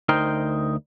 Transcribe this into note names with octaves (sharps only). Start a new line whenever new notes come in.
D2 D#4 A#4 C5 G5